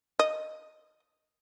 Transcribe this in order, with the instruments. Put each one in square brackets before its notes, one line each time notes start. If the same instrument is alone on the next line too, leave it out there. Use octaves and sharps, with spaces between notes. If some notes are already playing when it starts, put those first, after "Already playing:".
[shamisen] D#5